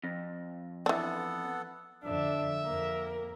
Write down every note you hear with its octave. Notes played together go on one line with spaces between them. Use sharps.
F2
E3 B3 D4 A4 F#5
F2 D3 D4 E5
F2 A#3 A#4